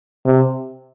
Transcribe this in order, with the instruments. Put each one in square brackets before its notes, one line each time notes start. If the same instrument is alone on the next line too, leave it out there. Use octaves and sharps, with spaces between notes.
[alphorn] C3